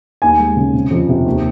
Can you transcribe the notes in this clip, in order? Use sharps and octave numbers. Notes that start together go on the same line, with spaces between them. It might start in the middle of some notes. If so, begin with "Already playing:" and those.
D#2 G#5
G#3
C#3
C3
F2
C3
D#2